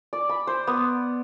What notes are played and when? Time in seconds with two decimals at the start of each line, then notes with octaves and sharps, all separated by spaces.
0.13 D5
0.29 B5
0.47 C5
0.67 B3